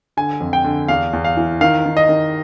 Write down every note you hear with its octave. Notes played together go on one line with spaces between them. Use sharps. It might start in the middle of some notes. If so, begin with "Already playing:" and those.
D3 G#5
F2
G5
D3
E2 F5
E2
F5
E3
D#3 F5
D#3
D#5
D#3